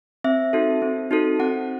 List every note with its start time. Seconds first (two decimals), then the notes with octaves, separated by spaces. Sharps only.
0.24 C4 E5
0.53 D#4 F#4 A4
0.82 C4
1.11 D#4 F#4 A4
1.40 C4 F#5